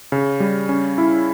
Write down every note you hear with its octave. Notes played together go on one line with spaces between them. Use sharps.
C#3
G3
C#4
E4